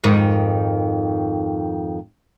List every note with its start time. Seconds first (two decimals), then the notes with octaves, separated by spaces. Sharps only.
0.04 F2 G#2 D#3